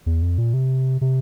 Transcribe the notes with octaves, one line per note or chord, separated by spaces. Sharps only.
E2
F2
A#2
C3
C3